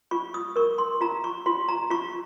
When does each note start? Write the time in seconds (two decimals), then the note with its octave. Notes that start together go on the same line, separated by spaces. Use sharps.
0.11 F4 C#6
0.34 D#6
0.56 A#4 C#6
0.78 C6
1.01 F4 A#5
1.24 C#6
1.46 F4 C6
1.68 A#5
1.90 F4 C#6